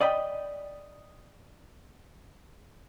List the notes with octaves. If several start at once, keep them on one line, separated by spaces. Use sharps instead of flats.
D5 D#5 G5 B5